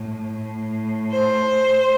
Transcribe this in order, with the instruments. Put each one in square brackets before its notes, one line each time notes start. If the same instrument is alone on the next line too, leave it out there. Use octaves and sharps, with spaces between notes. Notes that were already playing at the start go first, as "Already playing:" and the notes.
Already playing: [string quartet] A2
A2
C5